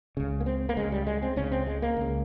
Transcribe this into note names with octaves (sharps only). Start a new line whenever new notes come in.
C#2 C#3
A#3
C4
A#3
C#2 C#3 G#3
G3
G#3
C4
C#2 C#3 C#4
C4
G#3
A#3
C#2 C#3